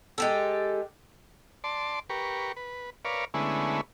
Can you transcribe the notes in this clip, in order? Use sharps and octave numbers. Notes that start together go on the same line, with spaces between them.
G#3 G4 A4
D5 A5 C6
G4 A#4 B4 C#6
B4
A#4 B4 C#5 D5 F5
D3 G#3 A3 B3 C#4 E4